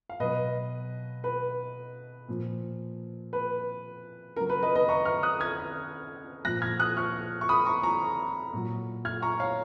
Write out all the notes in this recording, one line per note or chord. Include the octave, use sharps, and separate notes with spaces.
F5
B2 F#3 B4 D#5
B4
A#2 F3
B4
C#3 F#3 A#4
B4
B4 D#5
B4 D#5
A#5 C#6
C#6 F6
D#6 F#6
F6 G#6
A#2 F3 F#6 A#6
F6 G#6
D#6 F#6
C#6 F6
C#6
B5 D#6
A#5 C#6
A#5 C#6
A#2 F#3
F6 G#6
A#5 C#6
C#5 F5